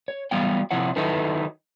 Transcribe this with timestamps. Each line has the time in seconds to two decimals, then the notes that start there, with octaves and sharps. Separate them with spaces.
0.08 C#5
0.31 E3 F#3 G3 B3 F5 G5
0.71 C3 F3 E4 C#5 F#5
0.96 D#3 F#3 D#4 E4 A4 B4